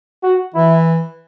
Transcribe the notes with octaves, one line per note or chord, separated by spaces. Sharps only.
F#4
E3 E4